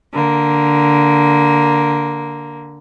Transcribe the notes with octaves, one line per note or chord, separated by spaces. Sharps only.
D3 A#3